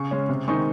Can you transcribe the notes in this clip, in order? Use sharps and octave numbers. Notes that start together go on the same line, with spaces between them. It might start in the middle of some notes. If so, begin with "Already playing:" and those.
Already playing: C#3 C#6
G#3 C#4
C3
D#3 G#3 C4 D#4 C#6